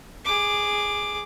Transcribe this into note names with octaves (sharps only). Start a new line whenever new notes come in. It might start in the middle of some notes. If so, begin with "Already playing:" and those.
G#4 D6